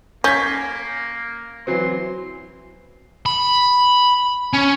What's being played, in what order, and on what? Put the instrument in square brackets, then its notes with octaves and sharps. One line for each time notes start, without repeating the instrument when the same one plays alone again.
[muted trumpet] A#3 [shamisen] C#4 [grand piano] G6 G#6 B6
[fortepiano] E3 F#3 C4 [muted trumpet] C6
[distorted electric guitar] B5
C#4